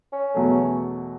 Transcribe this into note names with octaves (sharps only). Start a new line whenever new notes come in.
C#4
E2 B2 F#3 A3